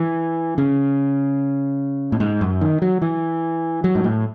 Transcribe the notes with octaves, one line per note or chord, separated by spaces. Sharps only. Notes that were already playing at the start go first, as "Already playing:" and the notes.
Already playing: E3
C#3
A2
G#2
F#2
D#3
F#3
E3
F#3
G#2
A2